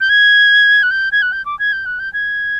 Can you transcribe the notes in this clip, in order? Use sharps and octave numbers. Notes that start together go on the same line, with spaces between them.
G6
G#6
F#6
G6
G#6
F#6
G6
D6
G#6
G6
F#6
G6
G#6